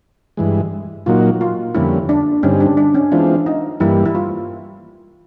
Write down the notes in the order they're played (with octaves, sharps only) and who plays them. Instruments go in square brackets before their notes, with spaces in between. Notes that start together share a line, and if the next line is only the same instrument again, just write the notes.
[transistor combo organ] G2 E3 G#3
[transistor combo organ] A#2 F#3 A#3 D#4 F#4 [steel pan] F4
[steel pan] F4
[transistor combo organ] F2 D3 G3 A#3 C#4 [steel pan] E4
[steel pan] D4
[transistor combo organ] G2 D3 G3 C4 D#4 [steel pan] C#4
[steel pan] D4
D4
C#4
[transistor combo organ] E3 G#3 C4 F4 [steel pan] D4
[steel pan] D#4
[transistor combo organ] G2 E3 G3 A#3 [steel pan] E4
[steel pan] E4
F4